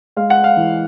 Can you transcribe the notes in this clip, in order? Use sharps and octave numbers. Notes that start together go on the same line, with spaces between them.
G#3 F5
F#5
F5
E3